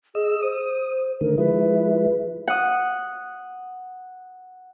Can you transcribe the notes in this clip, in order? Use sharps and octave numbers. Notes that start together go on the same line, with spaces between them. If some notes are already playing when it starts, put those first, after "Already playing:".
G#4 D#5 E6
C5 D#6
D3 D#3 A3 A#4
F3 G#3 E4 B4
F#5 D#6